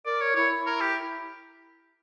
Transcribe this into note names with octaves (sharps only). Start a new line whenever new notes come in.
A#4 D5
C#5
E4 C#5
A#4
G4